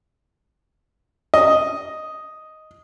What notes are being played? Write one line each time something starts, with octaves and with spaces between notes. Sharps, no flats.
D#5